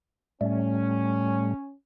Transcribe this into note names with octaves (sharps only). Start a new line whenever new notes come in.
A2 G3 A3 C#4